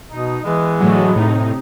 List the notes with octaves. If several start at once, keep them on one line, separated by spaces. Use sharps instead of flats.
B2 D#4
E3 G#3 B3
A2 D3 F#3 A3
A2 C3 D#4